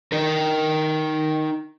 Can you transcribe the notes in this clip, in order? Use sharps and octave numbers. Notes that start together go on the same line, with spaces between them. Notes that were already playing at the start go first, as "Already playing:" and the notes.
D#4 A#4